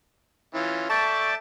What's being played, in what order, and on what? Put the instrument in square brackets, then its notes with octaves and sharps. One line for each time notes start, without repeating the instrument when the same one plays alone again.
[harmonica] E3 C#4 F4
[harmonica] A4 E5 A5 [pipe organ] D5 G5 A6 [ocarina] C#6